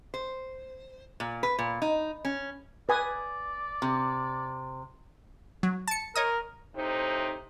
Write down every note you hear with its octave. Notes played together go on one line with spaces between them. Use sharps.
C5
A#2
B4
A#2
D#4
C#4
B4 D5 G#5 D#6
C3
F#3
A5 C#7
A#4 C#5 D#5 D#6
A2 C3 D#4 C5